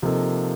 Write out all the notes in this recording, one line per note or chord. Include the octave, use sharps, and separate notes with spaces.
C3 F3 A#3 D#4 A4